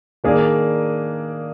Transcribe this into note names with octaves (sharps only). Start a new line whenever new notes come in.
D#3 A#3 D4 G#4 D5